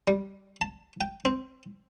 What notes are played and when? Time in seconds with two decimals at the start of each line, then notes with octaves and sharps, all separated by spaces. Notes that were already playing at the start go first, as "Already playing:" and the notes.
0.08 G3
0.61 A5
1.01 G5
1.25 C4